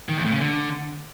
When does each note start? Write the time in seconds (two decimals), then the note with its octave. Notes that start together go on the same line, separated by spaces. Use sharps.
0.09 D#3
0.17 E2
0.24 A2
0.32 C#3
0.40 D3